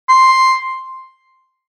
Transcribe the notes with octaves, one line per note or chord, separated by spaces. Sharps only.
C6